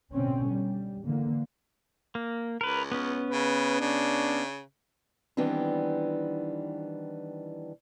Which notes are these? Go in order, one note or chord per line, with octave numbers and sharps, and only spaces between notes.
B2 D3 C4 C#4
G3
D3 E3 A#3
A#3
C#2 A#4 B4
B3 C#4
C#3 B4
C#3 D4
D#3 E3 G3 B3 C4 D4